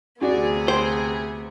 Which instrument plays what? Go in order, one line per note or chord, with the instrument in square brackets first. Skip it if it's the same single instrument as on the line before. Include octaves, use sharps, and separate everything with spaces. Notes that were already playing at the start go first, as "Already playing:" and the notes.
[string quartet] D2 C3 B3 [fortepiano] D4 F#4 D5 [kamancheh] G#4
[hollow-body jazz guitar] C5 [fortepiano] G5